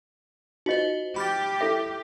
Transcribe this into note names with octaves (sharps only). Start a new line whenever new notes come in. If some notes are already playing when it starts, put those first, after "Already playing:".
D#4 F4 F#4 C5 D#5
G4 B5 F6 A6
E4 A4 E5